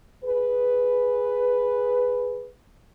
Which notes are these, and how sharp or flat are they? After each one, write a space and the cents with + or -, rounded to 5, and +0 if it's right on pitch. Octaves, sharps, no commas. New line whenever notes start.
G#4 +0 B4 +0